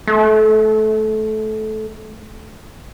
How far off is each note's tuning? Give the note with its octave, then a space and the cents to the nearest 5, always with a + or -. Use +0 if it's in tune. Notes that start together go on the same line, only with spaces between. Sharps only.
A3 -20